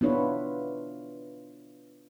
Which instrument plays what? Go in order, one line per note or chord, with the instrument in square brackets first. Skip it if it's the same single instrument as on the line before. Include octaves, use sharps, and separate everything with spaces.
[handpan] B3 D4 E4 F4 B4 C#5